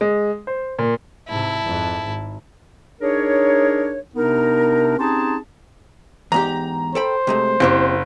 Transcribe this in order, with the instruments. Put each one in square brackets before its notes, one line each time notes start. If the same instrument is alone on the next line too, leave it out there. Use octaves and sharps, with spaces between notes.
[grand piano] G#3
C5
A#2
[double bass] G#2 C3 [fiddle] E4 A5
[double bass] F2 G#2
G#1
[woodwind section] D4 D#4 G#4 A#4 C#5
C3 B3 D4 D#4 A#4
C4 C#4 D#4 G4 G#4 A5
[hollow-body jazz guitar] E2 G#2 G4 [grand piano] A#5
[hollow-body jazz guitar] A4 G5 B5 [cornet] C5
[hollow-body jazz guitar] C3 G#3 A3
[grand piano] F#1 [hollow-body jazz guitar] C4 E4 G4